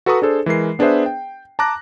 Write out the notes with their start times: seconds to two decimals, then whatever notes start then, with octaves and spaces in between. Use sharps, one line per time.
0.06 F#4 A4 B4 A#5 C#6 D#6
0.22 D4 G#4 A4 C5
0.46 E3 G#3 A#4 C7
0.79 B3 D4 G#4 B4 C5 E5
1.06 G5
1.59 A5 A#5 D6 F#6 A#6